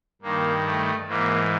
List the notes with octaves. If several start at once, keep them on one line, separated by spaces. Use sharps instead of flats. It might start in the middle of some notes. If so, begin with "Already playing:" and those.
G2 D#3 A#3
A3
G#2 E3 A#3